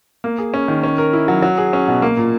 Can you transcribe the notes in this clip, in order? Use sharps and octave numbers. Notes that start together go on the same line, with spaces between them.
A#3
G#4
C#4
D#3
C#4
A#4
E4
F#3
F#3
G#4
C#4
B2
A#3
A#2